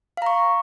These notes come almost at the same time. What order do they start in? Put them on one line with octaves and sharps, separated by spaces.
F5 A#5 C#6